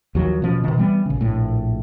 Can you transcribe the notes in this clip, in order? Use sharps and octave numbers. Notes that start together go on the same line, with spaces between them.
D#2 F3 F#3
B2 F3 C#4
B2 D#3
E3 G3 B3
A#1 C#3
A#1 A2